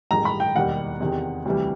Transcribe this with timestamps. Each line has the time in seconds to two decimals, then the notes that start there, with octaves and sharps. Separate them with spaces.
0.11 A1 G2 D#3 G#3 A#5
0.25 B5
0.40 G5
0.55 E1 D#2 D#3 G3 F#5
1.00 E2 C3 D#3
1.45 D2 C3 E3 G3